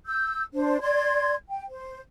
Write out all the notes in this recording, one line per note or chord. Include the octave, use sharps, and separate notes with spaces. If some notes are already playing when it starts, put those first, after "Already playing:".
E6 G6
D4 C5
D5 C6 G#6
G5
C5